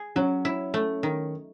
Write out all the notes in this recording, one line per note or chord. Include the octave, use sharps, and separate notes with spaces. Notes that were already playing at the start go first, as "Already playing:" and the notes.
Already playing: G#4
F#3 C#4
E4
A3
D#3